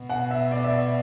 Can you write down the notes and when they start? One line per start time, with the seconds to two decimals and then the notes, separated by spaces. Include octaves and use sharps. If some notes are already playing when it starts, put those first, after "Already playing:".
Already playing: B2
0.09 F#5
0.31 E5
0.51 D5
0.64 E5
0.72 D5